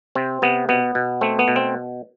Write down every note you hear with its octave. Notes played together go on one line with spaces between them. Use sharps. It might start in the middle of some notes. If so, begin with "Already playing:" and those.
C3 C4
C3 B3
B2 B3
B2
A3 C4
B3
B2
C4